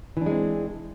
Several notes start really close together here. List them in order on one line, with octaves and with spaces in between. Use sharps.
E3 D4 G#3 C4